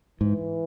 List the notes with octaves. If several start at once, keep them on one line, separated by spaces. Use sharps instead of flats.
G#2 E3